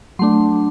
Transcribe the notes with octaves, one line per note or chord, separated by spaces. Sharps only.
F#3 A3 D4 C6